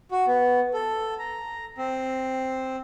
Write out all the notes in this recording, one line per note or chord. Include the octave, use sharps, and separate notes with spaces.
F#4
B3
A4
A#5
C4